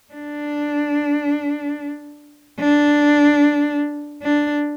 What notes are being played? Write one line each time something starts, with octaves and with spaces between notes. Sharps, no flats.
D4
D4
D4